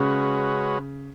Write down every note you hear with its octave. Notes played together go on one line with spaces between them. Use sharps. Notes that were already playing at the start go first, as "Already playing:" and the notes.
Already playing: C#3 G#3 C#4 F#4 B4